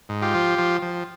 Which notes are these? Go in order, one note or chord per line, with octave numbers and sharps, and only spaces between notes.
G#2
F4 G4
F3
F3
F3